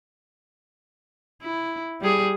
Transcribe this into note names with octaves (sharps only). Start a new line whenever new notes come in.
E4
G3 G#4